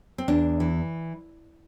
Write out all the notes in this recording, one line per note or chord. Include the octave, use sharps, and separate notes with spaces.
C4
E2 D4
E3